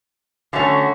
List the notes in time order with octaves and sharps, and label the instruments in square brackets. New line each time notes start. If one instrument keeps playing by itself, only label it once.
[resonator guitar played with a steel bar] D3 F#3 A3 C#4 F#4